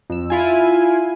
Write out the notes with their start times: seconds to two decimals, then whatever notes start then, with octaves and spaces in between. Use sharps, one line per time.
0.10 F2 E6
0.30 E4 F4 G#5